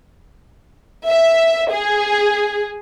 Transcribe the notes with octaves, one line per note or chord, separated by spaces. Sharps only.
E5
G#4